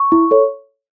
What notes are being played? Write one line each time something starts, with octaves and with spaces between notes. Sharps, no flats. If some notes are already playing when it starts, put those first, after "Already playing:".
Already playing: C#6
E4
A4 C#5